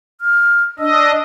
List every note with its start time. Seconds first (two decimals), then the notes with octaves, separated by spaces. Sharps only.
0.21 F6
0.79 D4 D#5 E6